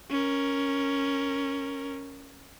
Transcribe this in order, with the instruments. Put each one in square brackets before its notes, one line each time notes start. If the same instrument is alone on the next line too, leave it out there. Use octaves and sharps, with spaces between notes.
[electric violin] C#4 A#4